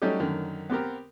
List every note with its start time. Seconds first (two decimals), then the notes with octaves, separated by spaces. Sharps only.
0.02 F#3 G3 A3 C#4 D#4 G4
0.20 F#2 D3 D#3
0.70 B3 C4 G4 A#4